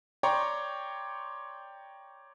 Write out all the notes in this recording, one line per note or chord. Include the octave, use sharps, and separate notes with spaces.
C#5 D5 G5 A#5 C6 C#6